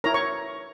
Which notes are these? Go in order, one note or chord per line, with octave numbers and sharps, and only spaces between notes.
E4 A#4 C#5 A#5
C#5 C#6